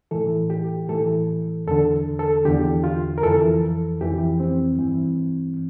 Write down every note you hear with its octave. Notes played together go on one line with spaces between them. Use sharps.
A2 E3 A4
G4
A2 E3 A4
E2 D3 A4
A4
E2 D3 G4
F4
A#4
F2 E3 A4
F2 E3 G4
C4
G2 E3